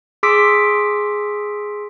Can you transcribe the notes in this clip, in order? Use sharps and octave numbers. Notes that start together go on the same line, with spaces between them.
G#4 C6 D6 E6 B6 D7